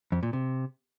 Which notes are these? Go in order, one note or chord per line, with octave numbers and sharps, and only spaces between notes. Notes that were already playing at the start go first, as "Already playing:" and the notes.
F2
A#2
C3